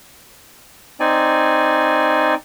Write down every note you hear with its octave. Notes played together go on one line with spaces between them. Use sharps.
C4 D#4 D5 G#5